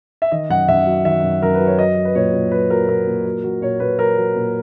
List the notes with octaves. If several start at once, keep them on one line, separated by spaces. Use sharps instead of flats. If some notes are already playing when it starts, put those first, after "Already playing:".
E5
D#3 D#5
F#2 F#5
F#2 E5
F#3
D#3 E5
F#2
F#2 A#4
B4
F#3
C#5
F#3 D#5
F#3
B4
A#2 C#5
A#2
F#3 B4
F#3 A#4
A#2 A#4
A#2
F#3
F#3
A#2 C#5
A#2 B4
F#3 A#4
F#3
A#2